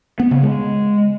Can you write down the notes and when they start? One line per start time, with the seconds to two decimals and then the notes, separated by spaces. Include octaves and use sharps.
0.20 B3
0.31 C#3
0.43 G#3